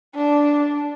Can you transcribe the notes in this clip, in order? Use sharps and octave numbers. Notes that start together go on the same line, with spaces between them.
D4